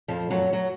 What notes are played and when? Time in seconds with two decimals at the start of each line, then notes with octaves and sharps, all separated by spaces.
0.08 F2 F3
0.30 F#2 F#3
0.53 F#3